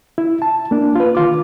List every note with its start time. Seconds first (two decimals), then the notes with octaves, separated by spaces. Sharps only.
0.18 E4
0.42 A5
0.71 A#3 D4
0.96 F4 B4
1.15 D#3 F4 D6